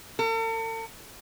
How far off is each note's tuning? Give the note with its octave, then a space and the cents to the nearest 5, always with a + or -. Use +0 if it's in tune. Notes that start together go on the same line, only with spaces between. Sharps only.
A4 +45